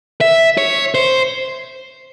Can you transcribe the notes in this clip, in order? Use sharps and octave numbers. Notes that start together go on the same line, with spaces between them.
E5
C#5
C5